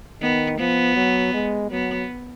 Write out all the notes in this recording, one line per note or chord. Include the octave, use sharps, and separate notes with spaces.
D#3 B3
F3 B3
F#3
G#3
F#3 B3